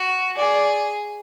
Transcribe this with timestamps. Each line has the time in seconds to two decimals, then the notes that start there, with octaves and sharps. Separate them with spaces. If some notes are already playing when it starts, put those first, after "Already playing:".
Already playing: F#4
0.37 G#4 D5